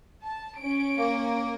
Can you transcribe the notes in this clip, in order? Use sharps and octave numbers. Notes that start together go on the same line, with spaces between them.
A5
C#4 D7
A#3